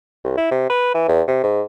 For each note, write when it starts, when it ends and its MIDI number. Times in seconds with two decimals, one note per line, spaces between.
0.24 0.36 36
0.37 0.49 64
0.51 0.67 48
0.70 0.91 71
0.94 1.07 52
1.08 1.22 40
1.27 1.39 48
1.43 1.62 44